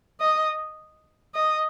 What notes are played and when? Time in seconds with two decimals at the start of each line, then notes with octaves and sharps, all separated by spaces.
0.20 D#5
1.34 D#5